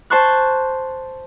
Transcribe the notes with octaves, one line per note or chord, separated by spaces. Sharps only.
C5 A5 C6 C#6 F#6